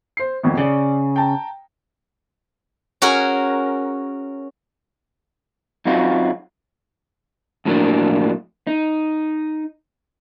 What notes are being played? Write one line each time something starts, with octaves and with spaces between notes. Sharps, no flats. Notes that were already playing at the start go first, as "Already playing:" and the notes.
C5 C7
G#1 F2 A#2
C#3 D5
G5 A5 A#5
C#4 F#4 G#4 A#4
F#2 F#3 C4 D#4 F4 F#4
F2 A2 F#3 A#3 C4 D4
D#4